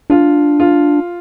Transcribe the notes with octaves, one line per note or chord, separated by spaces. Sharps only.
D4 F4
F4